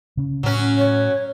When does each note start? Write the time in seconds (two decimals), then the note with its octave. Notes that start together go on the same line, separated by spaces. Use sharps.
0.17 C#3 C#4
0.43 A2 F#3 C#4
0.78 C#5